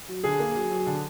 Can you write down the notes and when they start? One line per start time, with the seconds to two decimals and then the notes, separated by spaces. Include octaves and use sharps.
0.08 F#3
0.24 D3 G#4
0.39 A#3
0.55 F#3
0.71 F#3
0.86 D3